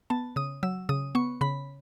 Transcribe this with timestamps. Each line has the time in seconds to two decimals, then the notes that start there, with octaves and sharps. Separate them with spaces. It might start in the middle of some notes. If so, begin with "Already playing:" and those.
0.10 B3 A5
0.36 C#3 D#6
0.63 F#3 E6
0.89 C#3 D#6
1.15 B3 C#6
1.41 C#3 B5